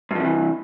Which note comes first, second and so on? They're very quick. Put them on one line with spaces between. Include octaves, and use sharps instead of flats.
G2 F3 C3 E3